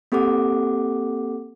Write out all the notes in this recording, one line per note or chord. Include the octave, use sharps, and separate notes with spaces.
A#3 C4 G4 A4 F#5 D6